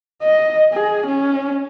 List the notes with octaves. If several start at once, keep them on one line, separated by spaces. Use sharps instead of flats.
D#5
G#4
C#4